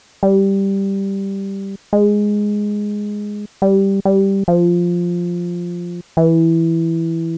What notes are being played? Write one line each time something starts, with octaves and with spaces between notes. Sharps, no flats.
G3
G#3
G3
G3
F3
E3